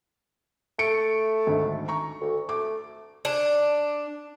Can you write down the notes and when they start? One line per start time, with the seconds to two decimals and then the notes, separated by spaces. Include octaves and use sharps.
0.79 A3 C#7 D7
1.47 G#1 D2 G#2
1.88 A#5 C#6
2.21 D2
2.49 A3 D6
3.25 D4